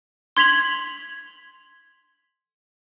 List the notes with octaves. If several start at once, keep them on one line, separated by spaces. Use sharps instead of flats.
C6 G#6 B6 F7 F#7